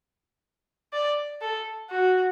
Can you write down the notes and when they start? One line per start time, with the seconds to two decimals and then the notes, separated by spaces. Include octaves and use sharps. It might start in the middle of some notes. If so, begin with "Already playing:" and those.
0.93 D5
1.41 A4
1.90 F#4